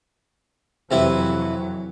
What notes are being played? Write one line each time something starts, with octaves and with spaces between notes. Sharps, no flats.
F2 C3 E3 F#3 E4 B4